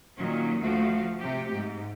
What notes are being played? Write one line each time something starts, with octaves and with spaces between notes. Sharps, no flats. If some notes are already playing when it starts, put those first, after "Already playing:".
A#2 D#3 F#3 C#4
D2 F3 A3 F#4 F5
C3 G4
G#2